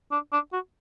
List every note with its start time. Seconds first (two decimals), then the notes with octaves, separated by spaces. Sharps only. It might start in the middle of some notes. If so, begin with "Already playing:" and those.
0.12 D4
0.33 D4
0.53 F#4